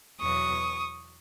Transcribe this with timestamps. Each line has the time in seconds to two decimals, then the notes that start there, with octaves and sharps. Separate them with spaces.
0.19 E2 B2 F#3 C#6 D#6